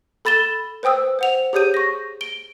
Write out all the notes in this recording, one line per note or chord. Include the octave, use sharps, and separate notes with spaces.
A4 B5 A6 E7 G7
B4 C5 G5 D#6 E6
C5 F#5 F7
G4 G#4 C#5 D#6 G6 D#7
C#6 A#6
D7 G7